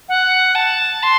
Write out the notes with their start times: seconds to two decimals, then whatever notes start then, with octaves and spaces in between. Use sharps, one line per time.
0.09 F#5
0.55 A5
1.03 C6